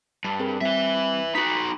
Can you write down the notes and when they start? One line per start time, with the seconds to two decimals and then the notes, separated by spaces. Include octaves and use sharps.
0.24 G2 A5
0.39 C4 G#4 A#4
0.61 G3 C4 B4 E5
1.35 D#4 F#4 B5 D#6 B6